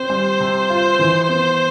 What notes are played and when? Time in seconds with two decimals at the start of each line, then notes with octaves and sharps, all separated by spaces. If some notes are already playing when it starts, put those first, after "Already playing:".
Already playing: C4 C5
0.10 G3
0.40 C3
0.69 F4
0.99 E3
1.29 B3